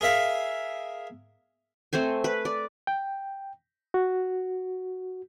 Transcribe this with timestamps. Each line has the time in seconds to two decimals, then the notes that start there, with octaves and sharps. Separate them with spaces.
0.01 G#4 A#4 E5 F5
1.93 A3 C4 C5 G#5
2.24 B4
2.45 D5
2.87 G5
3.94 F#4